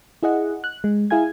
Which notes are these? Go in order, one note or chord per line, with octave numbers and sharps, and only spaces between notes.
E4 G#4 D#5 F#5
F#6
G#3
E4 G#4 F5 G#5 G#6